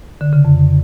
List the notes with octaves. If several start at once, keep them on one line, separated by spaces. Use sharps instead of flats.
D3
C#3
F2